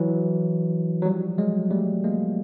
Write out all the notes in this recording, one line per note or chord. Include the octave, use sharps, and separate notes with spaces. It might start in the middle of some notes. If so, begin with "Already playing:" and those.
Already playing: E3 F#3
F#3
F3 G3
F#3 G#3
G3 A3
G#3 A#3